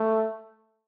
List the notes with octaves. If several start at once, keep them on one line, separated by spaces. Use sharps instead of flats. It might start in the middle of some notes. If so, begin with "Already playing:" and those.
Already playing: A3